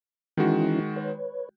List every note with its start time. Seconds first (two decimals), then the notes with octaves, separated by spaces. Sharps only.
0.37 D#3 E3 G#3 C#4 E4 F#4
0.96 B4 C#5